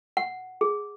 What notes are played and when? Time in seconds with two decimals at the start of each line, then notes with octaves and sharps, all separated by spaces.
0.17 F#5
0.61 G#4